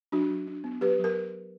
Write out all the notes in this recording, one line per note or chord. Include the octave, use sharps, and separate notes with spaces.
F#3 D4 F#4
F#3
D4
B3
F#3 G4 B4
F#3 A#4